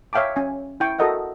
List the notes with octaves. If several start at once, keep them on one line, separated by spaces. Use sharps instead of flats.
C#5 E5 F5 G5 A5 D6
C#4 G#5
E4 G5 C#6
F#4 A4 A#4 D#5 E5 F#5